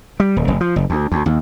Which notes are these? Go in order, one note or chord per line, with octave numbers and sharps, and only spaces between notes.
G3
D#1
F1
F3
F#1
D2
D2
D#2